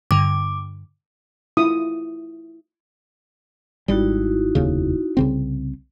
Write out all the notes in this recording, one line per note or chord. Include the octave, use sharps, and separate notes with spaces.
G2 D3 D6
E4 F4 D#6
G#1 G3 D#4 E4 F#4
F1 D#2 C#3
C2 C#3 C4